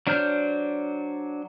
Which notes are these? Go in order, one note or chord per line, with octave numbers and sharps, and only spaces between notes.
F#3 D4 C5 F6 G6